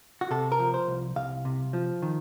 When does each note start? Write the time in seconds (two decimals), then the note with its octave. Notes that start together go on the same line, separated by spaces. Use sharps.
0.21 F#4
0.31 C3 A4
0.52 A#4
0.59 F3
0.74 C5
0.88 C2
1.16 C2 F5
1.45 C3
1.73 F3
2.02 D#3